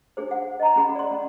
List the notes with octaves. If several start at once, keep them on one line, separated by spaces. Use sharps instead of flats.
D4 G#4 C5
F#5
D#5 A#5
C#4 G#4 F#5 B5
D5 C6
C#4